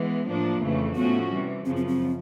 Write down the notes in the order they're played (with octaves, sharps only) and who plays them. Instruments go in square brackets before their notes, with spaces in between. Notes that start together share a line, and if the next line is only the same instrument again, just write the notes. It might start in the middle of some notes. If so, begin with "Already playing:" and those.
Already playing: [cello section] E3 G#3 B3
A2 F3 A#3 D4
F2 C#3 E3 A3
[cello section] A2 F3 A3 C#4 F#4 [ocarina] B3
[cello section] C3 E3 G3
[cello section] F#2 C#3 F3 [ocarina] C4
[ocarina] C4
C4